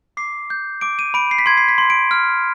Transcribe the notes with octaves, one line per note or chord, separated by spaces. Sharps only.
D6 C7
G6
D6 D7
D#7
B5 D7
C7
B6
C6 G#6
C7
B6
C6
D7
F6